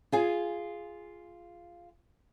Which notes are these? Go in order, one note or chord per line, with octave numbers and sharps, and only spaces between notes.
F4 G#4 G#5